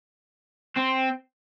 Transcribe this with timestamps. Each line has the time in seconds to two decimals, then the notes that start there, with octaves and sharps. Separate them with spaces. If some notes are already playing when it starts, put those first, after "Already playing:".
0.77 C4